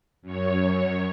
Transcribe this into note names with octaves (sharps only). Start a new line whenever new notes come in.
F#2 C#5